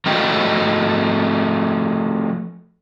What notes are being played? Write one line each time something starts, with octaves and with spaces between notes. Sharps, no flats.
F3 A3 F#4 D#5 G5